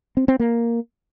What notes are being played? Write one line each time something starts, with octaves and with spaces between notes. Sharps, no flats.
C4
C4
A#3